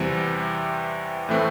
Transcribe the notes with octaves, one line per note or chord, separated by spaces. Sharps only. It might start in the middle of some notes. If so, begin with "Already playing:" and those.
Already playing: E2 C3 E3 G3 C4
A2 E3 A3 C4